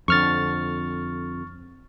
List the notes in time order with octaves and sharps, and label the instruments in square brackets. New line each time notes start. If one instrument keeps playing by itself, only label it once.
[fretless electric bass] F2 D3 [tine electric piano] C#6 F6 A6